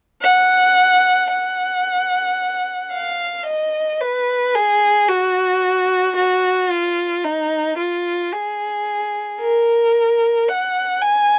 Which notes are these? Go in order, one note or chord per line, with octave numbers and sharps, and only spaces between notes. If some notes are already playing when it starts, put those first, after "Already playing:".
F#5
F#5
F5
D#5
B4
G#4
F#4
F#4
F4
D#4
F4
G#4
A#4
F#5
G#5